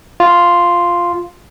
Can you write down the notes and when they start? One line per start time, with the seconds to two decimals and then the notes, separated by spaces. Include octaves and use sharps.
0.20 F4